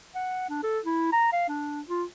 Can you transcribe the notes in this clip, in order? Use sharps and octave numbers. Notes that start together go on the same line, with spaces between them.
F#5
D4
A4
E4
A#5
F5
D4
F4